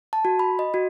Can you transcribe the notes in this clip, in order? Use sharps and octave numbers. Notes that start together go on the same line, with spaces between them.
A5
F#4
B5
D#5
F#4